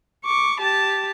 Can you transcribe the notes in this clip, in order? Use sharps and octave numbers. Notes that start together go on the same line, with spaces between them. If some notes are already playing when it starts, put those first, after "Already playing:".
C#6 D6
G4 A5